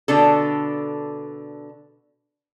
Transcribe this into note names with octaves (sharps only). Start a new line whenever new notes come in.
B2 D3 D4 A4